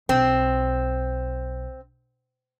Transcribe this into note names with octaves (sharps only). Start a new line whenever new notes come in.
B1 C4